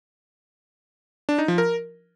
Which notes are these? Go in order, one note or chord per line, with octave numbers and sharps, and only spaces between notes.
D4
D#4
F3
A#4